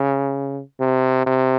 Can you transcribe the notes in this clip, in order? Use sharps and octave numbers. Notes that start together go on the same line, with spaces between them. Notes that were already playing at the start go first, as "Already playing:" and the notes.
Already playing: C#3
C3
C3